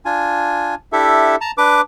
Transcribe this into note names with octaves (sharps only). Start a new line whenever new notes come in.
D4 F4 G#5
D4 E4 G4 A4 E5
A5 A#5
D4 B4 D6